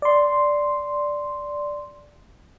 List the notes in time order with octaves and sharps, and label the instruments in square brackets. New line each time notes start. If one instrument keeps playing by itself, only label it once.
[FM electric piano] D5 C6